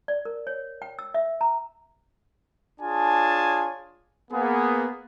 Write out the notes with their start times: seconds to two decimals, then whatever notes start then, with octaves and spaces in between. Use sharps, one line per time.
0.08 D5
0.25 A#4
0.47 C#5
0.82 G5
0.99 E6
1.14 E5
1.41 A#5
2.81 D4 F4 G#4 C#5 G#5 A5
4.32 A#3 B3 G#4